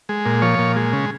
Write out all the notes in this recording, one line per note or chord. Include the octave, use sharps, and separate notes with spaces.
G#3
A#2
F3 C#5
A#2
G#3
C#3